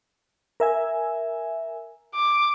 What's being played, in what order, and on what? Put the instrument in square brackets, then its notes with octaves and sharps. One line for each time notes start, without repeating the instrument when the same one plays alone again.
[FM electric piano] A#4 E5 G#5
[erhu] D6